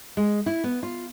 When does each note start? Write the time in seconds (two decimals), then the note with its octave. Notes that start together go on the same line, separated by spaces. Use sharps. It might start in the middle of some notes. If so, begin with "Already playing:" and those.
0.17 G#3
0.46 E4
0.64 B3
0.83 F4